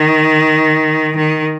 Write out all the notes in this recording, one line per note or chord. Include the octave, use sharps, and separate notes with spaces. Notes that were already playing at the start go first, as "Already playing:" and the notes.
Already playing: D#3
D#3